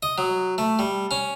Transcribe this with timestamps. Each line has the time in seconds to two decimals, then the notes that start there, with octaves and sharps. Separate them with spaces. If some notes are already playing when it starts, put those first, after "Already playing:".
0.03 D#5
0.18 F#3
0.58 A3
0.79 G3
1.11 C#4